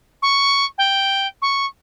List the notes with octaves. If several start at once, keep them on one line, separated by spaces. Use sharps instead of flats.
C#6
G5
C#6